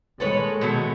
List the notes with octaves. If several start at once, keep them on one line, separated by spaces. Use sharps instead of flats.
A#2 D#3 G#3 A4 B4 C#5
B2 F#3 A3